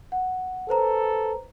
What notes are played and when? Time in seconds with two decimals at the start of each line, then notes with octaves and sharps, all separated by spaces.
0.12 F#5
0.69 A4 B4 C5 A#5